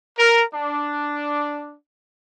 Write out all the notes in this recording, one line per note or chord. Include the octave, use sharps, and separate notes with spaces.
A#4
D4